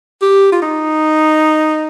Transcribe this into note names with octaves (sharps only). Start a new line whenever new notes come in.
G4
F4
D#4